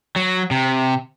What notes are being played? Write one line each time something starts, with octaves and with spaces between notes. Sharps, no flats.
F#3
C3